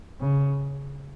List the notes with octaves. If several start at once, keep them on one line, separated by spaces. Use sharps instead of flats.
C#3